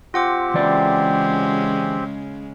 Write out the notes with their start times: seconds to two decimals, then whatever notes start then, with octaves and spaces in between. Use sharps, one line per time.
0.14 C4 F4 G4 F#5 D6
0.54 C#3 E3 G#3 D5